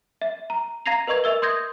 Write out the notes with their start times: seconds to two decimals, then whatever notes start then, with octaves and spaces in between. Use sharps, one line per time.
0.21 E5
0.50 A#5
0.86 F5 A#5 G#6 A#6 C7 F7
1.07 A#4 B4 D#5 C#6 G#6
1.24 A#4 E5 E6 G7
1.42 C6 D#6 G6 G#6 A#6